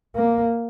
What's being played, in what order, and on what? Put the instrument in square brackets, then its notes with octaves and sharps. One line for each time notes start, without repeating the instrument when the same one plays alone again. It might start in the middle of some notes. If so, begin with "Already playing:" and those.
[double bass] A#3